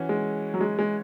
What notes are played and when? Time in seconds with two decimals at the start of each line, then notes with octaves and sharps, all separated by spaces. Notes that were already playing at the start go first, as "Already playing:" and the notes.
Already playing: E3 C#4 F#4
0.09 G#3
0.54 F#3
0.61 G#3
0.79 G#3